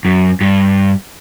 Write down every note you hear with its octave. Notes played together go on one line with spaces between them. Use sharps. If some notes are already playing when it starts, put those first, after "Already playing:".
F#2
G2